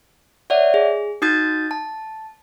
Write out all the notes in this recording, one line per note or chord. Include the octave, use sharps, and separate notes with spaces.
C#5 D5 E5 F#5
G#4
D#4 F#4 D#6 G6 A6
A5